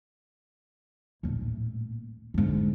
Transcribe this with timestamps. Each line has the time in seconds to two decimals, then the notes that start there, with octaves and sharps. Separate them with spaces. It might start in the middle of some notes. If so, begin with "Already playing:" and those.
1.23 D#1 A2
2.34 G#2 D3